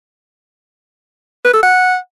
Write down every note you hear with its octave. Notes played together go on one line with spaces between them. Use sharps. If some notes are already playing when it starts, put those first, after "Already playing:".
B4
A4
F#5